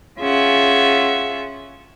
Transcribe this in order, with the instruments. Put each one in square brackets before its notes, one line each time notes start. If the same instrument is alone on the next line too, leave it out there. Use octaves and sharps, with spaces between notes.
[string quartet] C#4 F4 G#4 E5 F#5